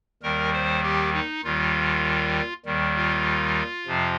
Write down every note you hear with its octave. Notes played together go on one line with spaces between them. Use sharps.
D#2 D#3 G3 A#4
C5
G4
D#4
D#2 D#3 G3 F4
D#2 D#3 G3
F4
F2 C3 F3